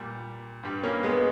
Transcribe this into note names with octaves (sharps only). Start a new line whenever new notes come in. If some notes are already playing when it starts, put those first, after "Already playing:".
Already playing: A#2 G3
G2 G3
A#3 C#4
G#3 B3